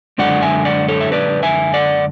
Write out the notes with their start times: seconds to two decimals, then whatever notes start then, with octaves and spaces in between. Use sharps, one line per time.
0.18 F#2 D3 G#3 D5 F#5
0.42 E5 G#5
0.65 D5 F#5
0.88 A4 C#5
1.01 E5
1.12 B4 D5
1.43 E5 G#5
1.74 D5 F#5